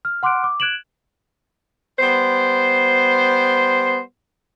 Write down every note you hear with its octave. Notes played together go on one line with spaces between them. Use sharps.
F6
F#5 C6 D6 F6 F#6 D7
D6
F#6 G#6 D7 E7 F#7
G3 B3 C5